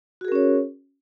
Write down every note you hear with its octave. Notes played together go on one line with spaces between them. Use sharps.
C#4 F#4 G#4 A#4 C#5